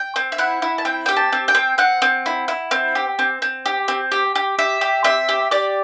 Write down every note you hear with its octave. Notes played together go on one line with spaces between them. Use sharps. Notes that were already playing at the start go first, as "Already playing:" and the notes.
Already playing: G5
C4
E5
E4 F#5
E4
A5
C4 G5
G4 G5
A5
C4
G5
C4
C4 F#5
C4
E4
E4
C4
G4
C4
C4
G4
C4
G4
G4
G4 E5
G4
C4 E5
G4
G4 D5